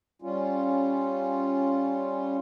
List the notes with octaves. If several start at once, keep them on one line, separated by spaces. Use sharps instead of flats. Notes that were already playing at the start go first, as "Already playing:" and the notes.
G3 C#4 F4